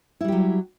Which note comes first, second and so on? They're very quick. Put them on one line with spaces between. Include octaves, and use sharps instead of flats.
E4 G3 G4 F#3